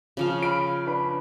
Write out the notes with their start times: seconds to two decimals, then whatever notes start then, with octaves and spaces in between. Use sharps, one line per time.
0.17 C#3 F3 F5
0.43 B5 F6 D7
0.86 D4 B4 B5